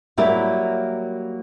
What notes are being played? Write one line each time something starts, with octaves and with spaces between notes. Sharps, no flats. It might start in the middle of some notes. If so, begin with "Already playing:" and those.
F#3 G3 A#3 E4 G4